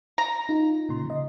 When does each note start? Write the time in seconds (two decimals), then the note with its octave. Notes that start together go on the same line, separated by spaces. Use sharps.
0.18 A#5
0.49 D#4 F4
0.89 A#2 C#3 C6
1.06 C#3 D#5